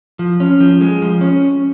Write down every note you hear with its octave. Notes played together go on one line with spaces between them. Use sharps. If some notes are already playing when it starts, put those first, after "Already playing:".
F3
C#4
F3
G#3
F3
C#4